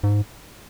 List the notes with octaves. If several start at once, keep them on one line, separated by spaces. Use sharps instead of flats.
G#2